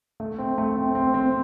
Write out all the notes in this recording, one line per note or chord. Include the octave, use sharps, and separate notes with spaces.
A3
C4
A3
C4
C4
C4